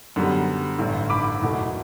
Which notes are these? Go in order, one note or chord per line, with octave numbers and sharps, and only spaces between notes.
F#2 D3 G3 B3
A1 G2 D3
B5 D6
F#1 E2 B2 A3